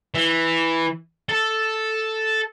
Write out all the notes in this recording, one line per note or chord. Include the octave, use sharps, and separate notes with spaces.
E3
A4